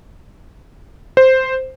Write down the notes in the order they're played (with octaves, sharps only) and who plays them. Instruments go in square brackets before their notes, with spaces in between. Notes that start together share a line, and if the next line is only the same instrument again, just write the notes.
[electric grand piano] C5